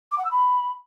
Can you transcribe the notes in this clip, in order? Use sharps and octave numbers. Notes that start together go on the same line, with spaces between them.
D6
F#5
E6
B5